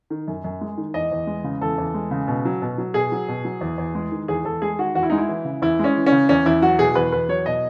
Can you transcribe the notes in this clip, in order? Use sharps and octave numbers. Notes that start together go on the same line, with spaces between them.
D#3
F#2
F#2
G#3
D#3
E2 D#5
E2
G#3
C#3
E2 A4
E2
G#3
C#3
B2
F#3
B2
F#3
B2 G#4
F#3
B2
F#3
E2
E2
G#3
D#3
E2 G#4
E2 A4
G#3 G#4
D#3 F#4
E2 F#4
E4
G#3 D#4
E4
E3
C#3
E2 E4
G#3 C#4
E3
C#4
C#3
E2 C#4
E2 E4
F#3 F#4
B2 G#4
E2 B4
E2 B4
F#3 C#5
B2 D#5